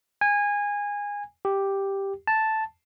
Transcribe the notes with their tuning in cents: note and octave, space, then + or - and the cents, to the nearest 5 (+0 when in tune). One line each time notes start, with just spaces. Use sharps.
G#5 -20
G4 +0
A5 +0